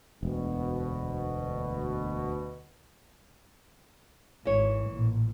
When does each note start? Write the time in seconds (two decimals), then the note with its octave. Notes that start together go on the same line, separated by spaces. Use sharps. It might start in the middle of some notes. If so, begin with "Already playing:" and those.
0.23 E1 D2 B2
4.45 G#1 E3 C#5
4.87 A1 A#2